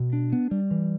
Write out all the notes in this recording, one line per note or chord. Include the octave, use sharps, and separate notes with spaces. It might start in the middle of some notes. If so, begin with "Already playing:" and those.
Already playing: B2
D4
B3
G3
E3